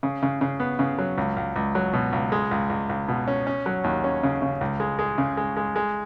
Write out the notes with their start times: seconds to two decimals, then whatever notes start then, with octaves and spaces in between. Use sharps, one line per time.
0.03 C#3
0.23 C#3
0.41 C#3
0.60 B3
0.79 C#3
0.99 F#3
1.18 C#2
1.37 C#2
1.56 C#2
1.75 F#3
1.93 B2
2.13 C#2
2.32 G#3
2.51 C#2
2.70 C#2
2.89 C#2
3.08 B2
3.28 C#4
3.47 C#4
3.66 F#3
3.84 D#2
4.04 C#4
4.23 C#3
4.42 C#3
4.61 C#2
4.80 G#3
4.99 G#3
5.18 C#3
5.37 G#3
5.57 G#3
5.76 G#3